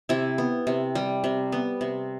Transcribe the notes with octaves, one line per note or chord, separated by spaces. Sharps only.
C3 E4
B3
C3
G3
C3
B3
C3